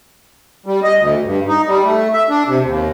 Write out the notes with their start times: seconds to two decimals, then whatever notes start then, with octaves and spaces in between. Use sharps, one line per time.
0.66 G3
0.83 D#5
0.98 D2
1.25 G2
1.48 D#4
1.67 G3
1.84 A3
2.13 E5
2.30 D4
2.48 C3
2.64 D#2